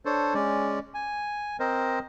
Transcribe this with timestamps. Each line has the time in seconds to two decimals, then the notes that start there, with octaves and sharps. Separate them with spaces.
0.05 D4 A4 C5 C#5
0.34 G#3 C#4 D5
0.94 G#5
1.60 C4 A#4 C5 D#5